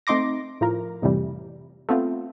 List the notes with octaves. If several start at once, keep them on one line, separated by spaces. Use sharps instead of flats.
A3 C4 D#4 C6 D6 A#6
A2 F3 A#4
F2 A2 C3 E3 G3
A3 B3 C4 F4